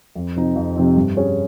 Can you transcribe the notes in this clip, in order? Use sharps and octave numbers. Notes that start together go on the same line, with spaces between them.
F2
C3 F3 C4 D#4
F2
C3 F3 C4 D#4
G2
G3 C#4 G#4 C#5